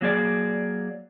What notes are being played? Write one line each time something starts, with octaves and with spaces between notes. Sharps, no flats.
F#3 A#3 G#4 D5